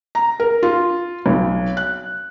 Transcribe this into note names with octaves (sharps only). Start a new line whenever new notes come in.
A#5
A#4
F4
B1
F#6